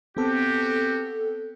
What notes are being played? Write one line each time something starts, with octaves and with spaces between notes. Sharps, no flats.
B3 C4 F#4 G4 A4